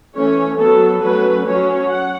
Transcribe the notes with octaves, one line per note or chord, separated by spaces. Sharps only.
E3 A3 C#4 C#5
F#3 B3 A4
F#3 A3 C#4 B4
F#3 C#4 C#5
F#5